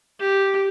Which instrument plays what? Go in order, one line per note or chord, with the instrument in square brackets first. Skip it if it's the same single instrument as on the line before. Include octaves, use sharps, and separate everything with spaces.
[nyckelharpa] G4